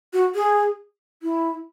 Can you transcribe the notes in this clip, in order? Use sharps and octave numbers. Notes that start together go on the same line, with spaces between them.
F#4
G#4
E4